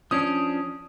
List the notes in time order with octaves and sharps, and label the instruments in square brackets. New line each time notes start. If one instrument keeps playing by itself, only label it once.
[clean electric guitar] F3 C#4 D4 [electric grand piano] D#6